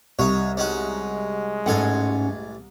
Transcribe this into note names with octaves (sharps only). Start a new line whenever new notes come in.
C2 D#4 C#5
G#3 C#4 D#4 F#4
A1 G#2 C#4 A4 F#5 G#5